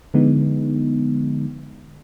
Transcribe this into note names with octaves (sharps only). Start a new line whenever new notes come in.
D3 F3 G#3 B3 D#4